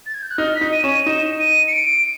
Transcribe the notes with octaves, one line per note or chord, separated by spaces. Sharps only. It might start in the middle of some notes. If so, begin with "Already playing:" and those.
A6
G#6
G6
F#6
D#4 F6
B6
D#4
D#7
C#4 E7
D#7
D#4 E7
D#7
C#7
D7